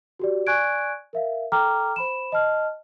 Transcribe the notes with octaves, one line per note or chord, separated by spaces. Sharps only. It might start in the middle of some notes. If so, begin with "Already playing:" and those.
F#4 G4 D5
D5 G#5 C#6 F#6 G#6 D7
A#4 E5 F5
A4 G5 A#5 D6 F6
C5 B5 E7
D#5 A5 F6